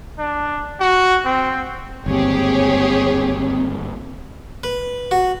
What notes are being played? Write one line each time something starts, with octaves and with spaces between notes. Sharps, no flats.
D4
F#4
C4
G1 D#2 G#2 C4 G4 G#4 C#5
B4
F#4